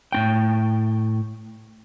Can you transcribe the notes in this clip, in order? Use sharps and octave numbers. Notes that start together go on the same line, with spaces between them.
A2 C#4 G5